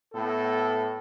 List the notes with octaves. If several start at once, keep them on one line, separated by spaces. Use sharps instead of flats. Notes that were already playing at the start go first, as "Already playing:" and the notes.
A2 B3 A4